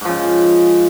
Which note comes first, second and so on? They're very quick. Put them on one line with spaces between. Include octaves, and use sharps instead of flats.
G#2 F3 C#3